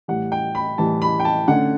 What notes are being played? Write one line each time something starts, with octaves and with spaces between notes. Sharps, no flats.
A2 E3 G3 F#5
G5
B5
A2 E3 G3 A5
B5
G5
A5
D3 A3 C#4 F#5